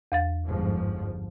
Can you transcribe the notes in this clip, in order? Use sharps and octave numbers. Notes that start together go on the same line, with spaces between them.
E2 F5 A6
G1 G#2 F3